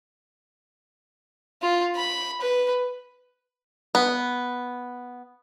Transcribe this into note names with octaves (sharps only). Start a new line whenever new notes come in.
F4
B5
B4
B3